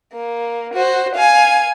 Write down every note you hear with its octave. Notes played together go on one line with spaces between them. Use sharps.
A#3
F#4 C5
F5 G#5